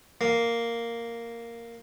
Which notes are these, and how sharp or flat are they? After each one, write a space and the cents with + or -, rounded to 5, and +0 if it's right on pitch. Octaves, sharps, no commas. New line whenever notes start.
A#3 -5